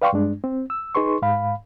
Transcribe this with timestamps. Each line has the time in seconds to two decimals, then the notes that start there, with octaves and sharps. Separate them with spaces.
0.02 B4 D5 F5 G5 C6 C#6
0.13 G2 G#3 D4
0.44 C4
0.70 E6
0.95 D#4 G#4 B4 C6 C#6
1.22 G#2 F5 B5